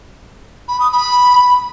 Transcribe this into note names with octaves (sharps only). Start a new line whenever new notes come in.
B5
D#6
B5